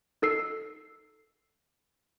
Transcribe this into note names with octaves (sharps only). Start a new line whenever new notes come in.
D#4 A4 E6 C7